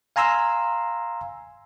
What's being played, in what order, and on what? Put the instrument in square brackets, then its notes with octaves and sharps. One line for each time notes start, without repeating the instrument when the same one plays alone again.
[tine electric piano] F5 G#5 A#5 C6 E6